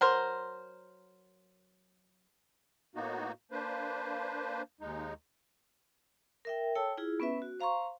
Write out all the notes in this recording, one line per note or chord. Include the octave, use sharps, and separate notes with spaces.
F#3 A#4 C5
A2 A#3 B3 D#4 F#4
A#3 D4 B4 C5
D#2 G#3 D#4
A#4 E5 G5
A4 C#5 G5 A5 E6
E4 F4 G#4
B3 C#4 B4 E5
F#4
C5 F5 A#5 C6 C#6